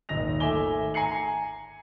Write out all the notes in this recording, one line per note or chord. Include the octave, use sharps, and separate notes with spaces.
D#1 G#1 D#5 A#6 F7
G#1 A3 E5 G#5 D6 G7
G#5 A#5 C7 C#7 F#7